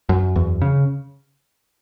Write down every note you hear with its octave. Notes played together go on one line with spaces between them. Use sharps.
F#2
E2
C#3